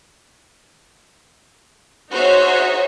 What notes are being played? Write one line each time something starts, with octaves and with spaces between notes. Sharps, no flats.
D#4 F#4 G#4 C5 C#5 E5